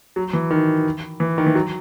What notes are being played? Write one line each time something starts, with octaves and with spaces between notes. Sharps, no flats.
F#3
E3
D#3
E3
D#3
E3
F#3